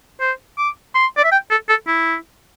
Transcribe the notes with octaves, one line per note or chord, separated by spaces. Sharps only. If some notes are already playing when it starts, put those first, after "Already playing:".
C5
D6
C6
D5
E5
G5
A4
A4
E4